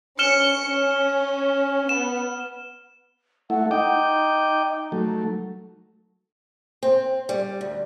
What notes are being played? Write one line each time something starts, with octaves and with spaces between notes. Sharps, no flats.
C#4 F6 C#7 E7 G7
C#4
B3 E7
A3 E4 F#5
D#4 D#5 G5 D6
F#3 A3
C4
G3
D2